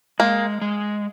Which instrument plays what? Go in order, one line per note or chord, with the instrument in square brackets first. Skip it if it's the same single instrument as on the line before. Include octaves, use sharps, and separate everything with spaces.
[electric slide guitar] G#3 [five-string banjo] A#3
[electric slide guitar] G#3